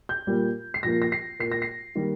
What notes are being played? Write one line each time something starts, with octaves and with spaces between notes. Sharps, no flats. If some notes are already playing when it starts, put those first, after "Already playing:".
G6
A#2 G3 A#3
C7
A#2 F3 A#3 A#6
A#6
C7
A#2 A#3 C7
A#6
C7
D#3 G3 A#3